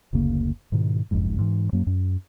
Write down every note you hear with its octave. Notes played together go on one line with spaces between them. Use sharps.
F#1 D2 C#3 A#3
G#2 B2 D#3
F#1 C2 F2 G#2
G#2 E3
F#2 F#3 A#3
F#2